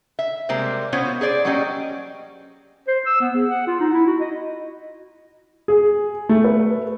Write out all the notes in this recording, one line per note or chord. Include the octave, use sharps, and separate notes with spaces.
E5
C3 G3 G#3 A#3 C5
B2 B3 C#4 F4 C5 C#5
G#4 C5 D5
F#3 G3 A#3 C#4 G4 D#5
C5
E6
B3
G#4
F#5
F4
D#4
E4
F#4
D#5
G#4
A3
B4